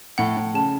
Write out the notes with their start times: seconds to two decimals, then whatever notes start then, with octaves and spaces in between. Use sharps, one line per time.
0.18 A2 F#5
0.37 A2
0.54 C#3 A5